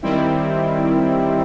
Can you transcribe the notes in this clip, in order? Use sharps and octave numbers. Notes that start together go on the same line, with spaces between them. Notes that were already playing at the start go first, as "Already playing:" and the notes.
D#3 G3 C4 E4